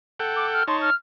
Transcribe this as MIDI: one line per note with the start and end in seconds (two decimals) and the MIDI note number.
0.20 0.63 69
0.20 0.63 78
0.20 0.63 79
0.36 0.47 86
0.53 0.66 89
0.67 0.90 63
0.67 0.90 73
0.67 0.90 81
0.67 0.77 84
0.81 0.93 89